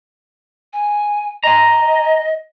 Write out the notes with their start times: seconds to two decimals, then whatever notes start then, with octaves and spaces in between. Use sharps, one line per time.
0.73 G#5
1.44 D#5 G#5 A#5